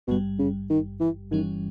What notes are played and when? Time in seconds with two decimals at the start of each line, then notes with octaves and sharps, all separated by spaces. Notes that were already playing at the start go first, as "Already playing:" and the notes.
0.08 G#1 G2 B2 G3
0.39 C#3
0.70 D#3
1.00 E3
1.31 G1 G2 D#3 E3 G3 C#4